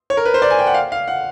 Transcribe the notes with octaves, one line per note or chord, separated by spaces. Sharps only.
C#5
A#4
B4
C5
D5
G#5
G5
F#5
F5
F5
F#5